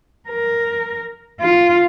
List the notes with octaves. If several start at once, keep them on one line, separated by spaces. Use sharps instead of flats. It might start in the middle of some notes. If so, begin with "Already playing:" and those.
A#4
F4